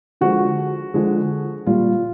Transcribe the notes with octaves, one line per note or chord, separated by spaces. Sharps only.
D3 F3 G#3 F#4
D3 F3 G#3
A#2 G3 F4